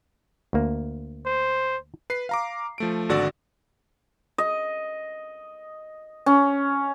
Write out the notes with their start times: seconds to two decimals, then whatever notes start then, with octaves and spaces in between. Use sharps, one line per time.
0.53 D2 A#3
1.26 C5
2.10 B4 C7
2.29 F5 A#5 D6
2.78 F3 A3 D7
3.09 G#1 D3 F#4 D5 E6
4.38 D#5
6.26 C#4